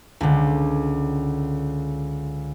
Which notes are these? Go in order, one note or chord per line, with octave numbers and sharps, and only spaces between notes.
C#2 D3